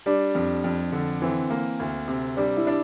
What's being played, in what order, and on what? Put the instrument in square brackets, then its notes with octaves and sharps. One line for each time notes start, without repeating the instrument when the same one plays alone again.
[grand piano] G3 [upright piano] D4
[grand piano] F2
F2
D3
[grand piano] E3 [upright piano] C4
[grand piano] A#3
D2
C3
[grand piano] G3 [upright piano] D4
[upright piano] E4
[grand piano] D4